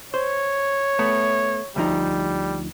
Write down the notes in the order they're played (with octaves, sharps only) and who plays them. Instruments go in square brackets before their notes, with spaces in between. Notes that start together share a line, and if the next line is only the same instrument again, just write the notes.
[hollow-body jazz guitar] C5 [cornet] C#5
[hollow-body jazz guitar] A3 B3
[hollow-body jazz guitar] D2 F3 D#4 [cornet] G3